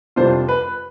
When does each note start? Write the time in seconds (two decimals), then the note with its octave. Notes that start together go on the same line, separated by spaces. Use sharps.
0.16 F2 C3 G3 D4 F4 C5
0.48 B4